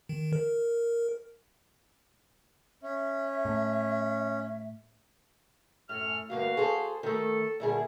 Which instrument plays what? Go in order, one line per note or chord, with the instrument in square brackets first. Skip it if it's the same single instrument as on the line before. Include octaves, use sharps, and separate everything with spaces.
[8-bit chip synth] D#3
A#4
[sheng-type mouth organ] C#4 [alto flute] E5
[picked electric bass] A2
[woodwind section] F#2 A4 F6 [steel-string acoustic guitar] A2
[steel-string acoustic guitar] D2 G2 A#3 [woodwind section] F#4 F5
[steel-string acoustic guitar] G#4 A4 C5
[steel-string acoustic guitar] D#3 A3 [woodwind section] A4
[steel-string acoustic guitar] A#2 E4 G#4 [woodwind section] D3 D#3 G3